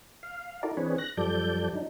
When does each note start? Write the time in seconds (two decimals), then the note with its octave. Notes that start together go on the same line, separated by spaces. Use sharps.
0.23 F5
0.63 D#4 E4 F#4 A4 A#4 D5
0.77 E3 C4 D4 G#4 B4 C#5
0.98 F#6 A#6
1.17 F#2 F3 G3 A4 D5 G6
1.73 F#3 D4 D#4